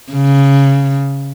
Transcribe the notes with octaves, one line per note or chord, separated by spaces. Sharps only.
C#3